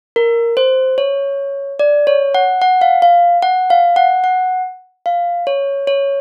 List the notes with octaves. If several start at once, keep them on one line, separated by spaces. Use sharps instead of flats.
A#4
C5
C#5
D5
C#5
F#5
F#5
F5
F5
F#5
F5
F#5
F#5
F5
C#5
C#5